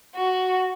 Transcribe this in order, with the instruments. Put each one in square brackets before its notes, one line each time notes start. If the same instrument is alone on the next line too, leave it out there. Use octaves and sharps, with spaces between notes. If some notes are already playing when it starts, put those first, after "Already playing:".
[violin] F#4